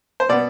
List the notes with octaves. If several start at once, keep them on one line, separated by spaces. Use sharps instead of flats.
C5
B2 B3 D5